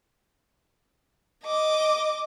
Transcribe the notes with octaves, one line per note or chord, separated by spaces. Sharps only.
D#5 D6